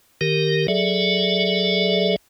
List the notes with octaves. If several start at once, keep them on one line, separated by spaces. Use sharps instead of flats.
D#3 G4 A#4
F#3 G#4 A4 D5 E5